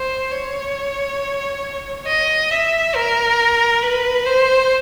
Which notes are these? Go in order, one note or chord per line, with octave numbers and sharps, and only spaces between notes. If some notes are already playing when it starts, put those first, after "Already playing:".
Already playing: C5
C#5
D#5
E5
A#4
B4
C5